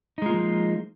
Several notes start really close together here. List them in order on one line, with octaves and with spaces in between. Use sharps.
D#4 G#3 F4 A#3 F3